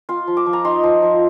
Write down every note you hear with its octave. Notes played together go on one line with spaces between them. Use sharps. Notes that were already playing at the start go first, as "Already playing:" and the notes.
F4 C6
F3
D6
F3
A#5
D#4 C6
F3
F3